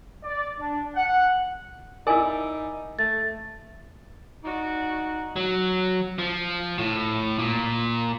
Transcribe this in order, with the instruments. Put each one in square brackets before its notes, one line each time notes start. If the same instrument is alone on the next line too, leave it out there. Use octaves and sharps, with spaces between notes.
[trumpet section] D5
D4
F#5
[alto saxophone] D#4 [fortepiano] E4 D5 [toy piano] A#4 G#5
[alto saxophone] A3 [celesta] A6
[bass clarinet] D#4 [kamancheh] F#4 D5
[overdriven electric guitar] F#3
F3
A2
A#2